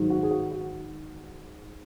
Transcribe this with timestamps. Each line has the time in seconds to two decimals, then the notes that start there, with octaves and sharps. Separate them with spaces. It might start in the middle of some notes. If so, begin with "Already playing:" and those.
Already playing: G#2 D#3 F#3
0.10 F#4
0.23 G#4
0.31 F#4
0.52 F#4